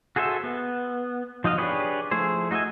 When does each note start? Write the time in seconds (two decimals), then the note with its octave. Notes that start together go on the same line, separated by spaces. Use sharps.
0.16 F#4 G#4 A4 C5 E5
0.44 B3
1.44 F3 D#4 F#4 D#5 F5
1.58 D4 G4 G#4 B4 C#5
2.11 F3 A3 E4 G#4 C5
2.51 D#4 F#4 D#5 E5 G#5